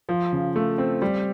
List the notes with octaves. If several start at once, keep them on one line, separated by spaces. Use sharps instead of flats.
F3
C#3
A3
C4
G3